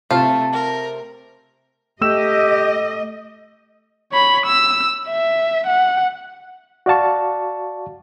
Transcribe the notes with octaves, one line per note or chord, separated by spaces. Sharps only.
C3 A3 C4 F4 A5
A#4
A3 G4 D#5 E6 E7
C#5 B5
E6
E5
F#5
F#4 D5 F5 A5 C#6